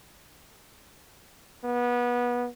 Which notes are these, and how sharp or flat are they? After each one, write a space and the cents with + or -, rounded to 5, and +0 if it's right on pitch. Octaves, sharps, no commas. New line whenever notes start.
B3 -25